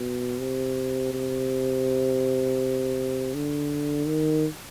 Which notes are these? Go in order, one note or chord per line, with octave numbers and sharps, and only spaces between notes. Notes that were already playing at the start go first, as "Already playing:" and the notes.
Already playing: B2
C3
C3
D3
D#3